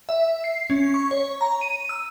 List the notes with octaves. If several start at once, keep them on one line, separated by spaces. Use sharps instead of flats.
E5
C7
C#4
C#6
C#5
A#5
D#7
E6